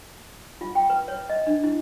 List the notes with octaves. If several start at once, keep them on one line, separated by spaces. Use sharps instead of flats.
F4
G5
B4
C#5
D#5
D4
E4